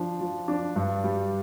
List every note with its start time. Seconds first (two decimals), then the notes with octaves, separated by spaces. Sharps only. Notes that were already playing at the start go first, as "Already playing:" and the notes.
Already playing: F3 D4
0.21 F3
0.48 D4
0.76 G2
1.04 G3